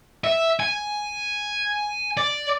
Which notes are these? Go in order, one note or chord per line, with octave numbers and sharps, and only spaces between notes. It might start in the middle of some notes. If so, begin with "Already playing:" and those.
E5
G#5
D5